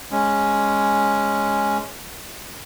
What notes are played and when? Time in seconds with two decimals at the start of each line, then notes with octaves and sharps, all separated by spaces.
0.12 G#3 C#4